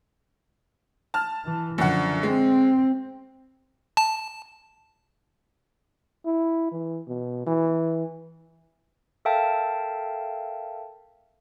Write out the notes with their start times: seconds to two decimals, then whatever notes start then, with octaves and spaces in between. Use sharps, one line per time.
1.14 A5 F6
1.45 E3
1.78 F#2 D3 F3 F#5
2.23 G#3 C4
3.97 A5
6.26 E4
6.72 E3
7.07 B2
7.46 E3
9.25 A4 A#4 E5 F5 G5 A5